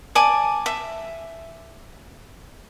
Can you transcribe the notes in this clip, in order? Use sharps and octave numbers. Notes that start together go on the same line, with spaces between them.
D5 G#5 A5 D6
E5